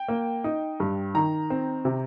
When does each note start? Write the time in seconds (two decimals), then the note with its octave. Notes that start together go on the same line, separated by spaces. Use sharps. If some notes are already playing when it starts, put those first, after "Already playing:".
Already playing: G5
0.08 A#3
0.44 D#4
0.80 G2
1.14 D#3 A#5
1.50 C4
1.85 C3